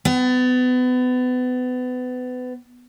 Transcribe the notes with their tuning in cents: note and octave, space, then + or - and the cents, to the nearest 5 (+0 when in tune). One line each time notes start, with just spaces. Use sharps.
B3 +30